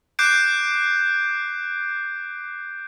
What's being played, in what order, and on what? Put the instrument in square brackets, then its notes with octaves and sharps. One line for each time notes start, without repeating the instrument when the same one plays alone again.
[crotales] D6 F#6 G6 C7 D7